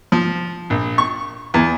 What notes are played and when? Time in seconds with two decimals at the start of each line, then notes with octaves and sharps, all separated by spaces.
0.12 F3
0.70 A#1
0.98 C#6
1.54 E2